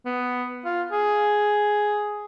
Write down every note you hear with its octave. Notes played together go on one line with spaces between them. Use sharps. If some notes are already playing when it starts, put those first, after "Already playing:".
B3
F4
G#4